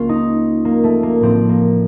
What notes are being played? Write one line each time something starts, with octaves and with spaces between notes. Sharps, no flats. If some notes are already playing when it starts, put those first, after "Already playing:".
Already playing: C#2 A#3 C#4 F4
D#4
A#3
A3
A#3
A1 A2 F3 C4
A#3